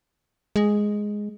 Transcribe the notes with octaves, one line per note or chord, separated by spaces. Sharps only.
G#3